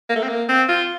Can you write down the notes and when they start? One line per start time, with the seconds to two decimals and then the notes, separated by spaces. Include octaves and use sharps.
0.09 A#3
0.16 A3
0.23 C4
0.29 A#3
0.49 C4
0.69 F4